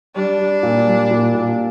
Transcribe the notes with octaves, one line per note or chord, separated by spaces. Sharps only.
G3 D4
G3
A#2
G3
A#2
A#2